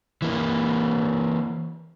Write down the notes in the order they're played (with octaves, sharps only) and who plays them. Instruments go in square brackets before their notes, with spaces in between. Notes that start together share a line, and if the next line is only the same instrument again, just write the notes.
[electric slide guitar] E3 A#3